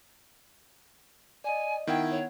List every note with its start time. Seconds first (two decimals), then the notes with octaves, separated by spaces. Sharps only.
1.44 D5 D#5 G#5
1.87 D#3 B3 E4 F#5 G5 G#6
2.11 C#5